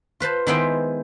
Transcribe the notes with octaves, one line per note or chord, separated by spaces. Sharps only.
F4 B4 C5 A5
D#3 G#3 B3 E4 C5 G5